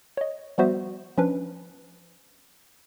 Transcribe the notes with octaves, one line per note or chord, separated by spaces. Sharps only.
C#5 D#5
F3 G3 B3 F#4 C5 E5
F3 C#4 D4 B4